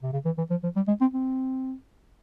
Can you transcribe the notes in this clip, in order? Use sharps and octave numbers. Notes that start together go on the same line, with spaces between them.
C3
C#3
E3
E3
F3
F3
G3
G#3
C4
C4